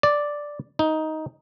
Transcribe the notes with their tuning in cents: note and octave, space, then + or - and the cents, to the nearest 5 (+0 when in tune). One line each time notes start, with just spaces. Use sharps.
D5 +0
D#4 +10